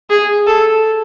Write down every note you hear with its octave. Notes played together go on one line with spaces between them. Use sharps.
G#4
A4